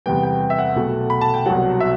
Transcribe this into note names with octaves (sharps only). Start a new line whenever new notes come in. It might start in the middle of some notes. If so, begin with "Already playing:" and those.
E2 C3 G3 B3 G5
G5
G5
E5
F#5
B1 B2 A3
B5
A5
G5
C2 B2 F#3 F#5
E5